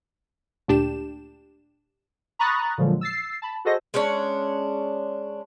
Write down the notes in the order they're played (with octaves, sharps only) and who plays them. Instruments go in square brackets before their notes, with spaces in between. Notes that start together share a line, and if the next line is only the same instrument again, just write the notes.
[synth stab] D2 A#2 D4 G4 E7
[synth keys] A#5 B5 C#6 D#6 F#6 A6
A#2 D3 F3 F#3 G#3
E6 A6 C7
A5 B5
F#4 G#4 A4 C5 D#5 A#6
[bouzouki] G#3 C#4 D4 C#5